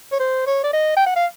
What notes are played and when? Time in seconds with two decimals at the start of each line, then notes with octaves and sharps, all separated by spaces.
0.13 C#5
0.20 C5
0.47 C#5
0.64 D5
0.73 D#5
0.97 G5
1.07 F#5
1.16 F5